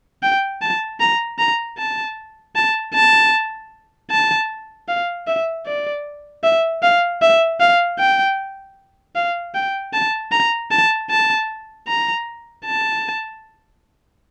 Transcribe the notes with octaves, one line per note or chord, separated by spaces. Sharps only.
G5
A5
A#5
A#5
A5
A5
A5
A5
F5
E5
D5
E5
F5
E5
F5
G5
F5
G5
A5
A#5
A5
A5
A#5
A5